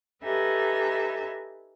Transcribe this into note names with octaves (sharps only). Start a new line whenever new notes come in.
D#4 G4 A4 B4 E5 G#5